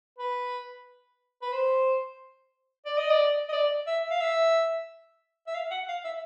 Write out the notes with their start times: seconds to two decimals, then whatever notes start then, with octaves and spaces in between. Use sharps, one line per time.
0.18 B4
1.42 B4
1.52 C5
2.85 D5
2.97 D#5
3.11 D5
3.49 D#5
3.52 D5
3.86 E5
4.11 F5
4.21 E5
5.47 E5
5.55 F5
5.70 F#5
5.88 F5
6.04 E5